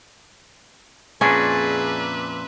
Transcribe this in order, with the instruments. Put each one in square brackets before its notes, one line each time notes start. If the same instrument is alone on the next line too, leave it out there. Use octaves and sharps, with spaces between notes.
[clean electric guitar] F2 A#2 D4 [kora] C#4 [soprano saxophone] G#4 [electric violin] B4 E5